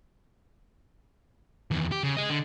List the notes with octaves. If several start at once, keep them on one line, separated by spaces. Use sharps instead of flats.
E2 D#3
G4
C#3
G#4 D#5
D3